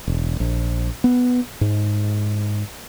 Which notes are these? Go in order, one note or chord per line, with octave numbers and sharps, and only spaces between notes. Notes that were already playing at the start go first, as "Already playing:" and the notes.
E1
A#1
B3
G#2